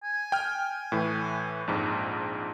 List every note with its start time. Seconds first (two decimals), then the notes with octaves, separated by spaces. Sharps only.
0.03 G#5
0.32 G5 F6
0.92 A2 E3
1.67 A#1 F2 G#2